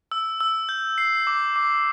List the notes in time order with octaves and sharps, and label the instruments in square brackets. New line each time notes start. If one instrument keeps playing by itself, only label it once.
[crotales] E6
E6
G6
C7
D6
D6